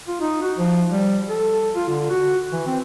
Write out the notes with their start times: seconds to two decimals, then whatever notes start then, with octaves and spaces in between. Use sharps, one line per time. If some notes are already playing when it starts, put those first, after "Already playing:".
0.08 F4
0.21 D#4
0.42 F#4
0.58 F3
0.91 G3
1.29 A4
1.75 F4
1.89 D3
2.10 F#4
2.52 E3
2.66 C4